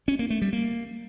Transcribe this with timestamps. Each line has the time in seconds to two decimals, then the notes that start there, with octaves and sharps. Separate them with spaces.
0.08 C#4
0.19 A#3
0.30 A3
0.42 G3
0.53 A#3